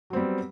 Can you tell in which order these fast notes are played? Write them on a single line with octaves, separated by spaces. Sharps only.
F#3 C4 G3 B3